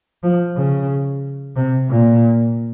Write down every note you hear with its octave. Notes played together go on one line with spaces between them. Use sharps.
F3
C#3
C3
A#2